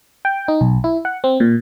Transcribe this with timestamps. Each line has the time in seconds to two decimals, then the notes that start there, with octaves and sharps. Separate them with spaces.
0.25 G5
0.48 D#4
0.61 B1
0.84 E4
1.05 F#5
1.24 C4
1.40 A#2